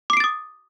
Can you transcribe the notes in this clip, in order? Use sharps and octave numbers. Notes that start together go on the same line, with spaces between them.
D6 D#6 A6 C7 D7